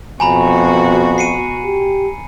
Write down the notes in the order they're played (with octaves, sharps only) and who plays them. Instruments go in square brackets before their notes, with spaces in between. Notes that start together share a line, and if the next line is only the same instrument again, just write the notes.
[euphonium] F2 [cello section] B2 F#4 [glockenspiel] G#5 A#5 B5
[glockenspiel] C7 C#7 D#7
[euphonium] G4